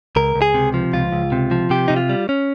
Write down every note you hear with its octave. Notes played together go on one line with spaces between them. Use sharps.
C#2 A#4
C#2
G#4
C3
F3
C#2 F4
C#2
C3
F3
C3 G4
C3 D#4
F4
G3
C#4